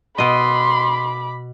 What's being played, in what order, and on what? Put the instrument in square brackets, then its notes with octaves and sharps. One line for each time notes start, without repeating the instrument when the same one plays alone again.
[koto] B2 D#5 [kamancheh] B5 D6 [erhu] C6